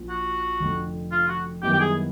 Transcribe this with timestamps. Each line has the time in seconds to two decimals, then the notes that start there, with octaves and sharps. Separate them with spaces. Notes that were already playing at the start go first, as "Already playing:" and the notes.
Already playing: A#1 A#2 F3
0.09 F#4
0.60 F1 F2 D3
1.12 F4
1.28 F#4
1.63 F#2 D#3 G3 B3 E4 G4
1.73 G4
1.80 G#4